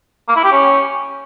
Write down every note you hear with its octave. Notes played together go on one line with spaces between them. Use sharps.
A#3
E4
G4
C#4